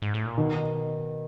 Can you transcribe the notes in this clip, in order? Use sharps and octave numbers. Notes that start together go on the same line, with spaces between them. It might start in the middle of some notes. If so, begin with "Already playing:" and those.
G#2
A2
A#2
B2 D#3